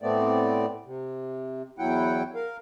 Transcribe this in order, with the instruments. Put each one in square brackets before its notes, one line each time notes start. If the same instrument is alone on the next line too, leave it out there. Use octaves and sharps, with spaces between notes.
[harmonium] A2 A3 B3 C4 D5
C3
E2 F#3 E4 F#5 G5
A#4 F5